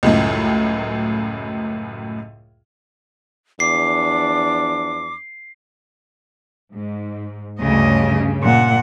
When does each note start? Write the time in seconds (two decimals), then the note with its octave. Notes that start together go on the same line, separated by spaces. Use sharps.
0.03 C#2 F#2 A2
3.60 E2 F3 D4 D6 C7
6.75 G#2
7.60 D2 G2 C#3 D#5
8.42 A#2 F#5